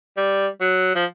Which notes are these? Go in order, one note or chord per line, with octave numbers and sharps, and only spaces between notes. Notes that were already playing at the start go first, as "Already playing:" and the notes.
G3
F#3
F3